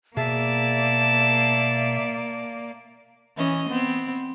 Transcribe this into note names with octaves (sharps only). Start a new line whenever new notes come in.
B2 A#3 G#4 D5 E5 A5
E3 C#4 D#5
B3 C4